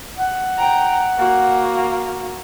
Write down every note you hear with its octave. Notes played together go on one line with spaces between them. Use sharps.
F#5
G5 A#5
A#3 F#4